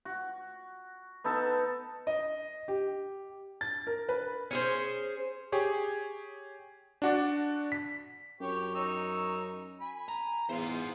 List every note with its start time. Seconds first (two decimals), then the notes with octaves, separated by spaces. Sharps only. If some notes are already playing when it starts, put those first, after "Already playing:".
0.05 F#4
1.24 B3 D#4 A4
2.07 D#5
2.68 G4
3.61 A6
3.87 A#4
4.09 B4
4.51 C#4 G#4 C5
5.52 G4 G#4 C#5
7.02 D4 F#4 D5
7.72 B6
8.41 F#2 G4 C#5 C#6
8.75 D#4 C#5 E6
9.81 G#5 B5
10.08 A#5
10.50 E2 B3 F4 G#4 C5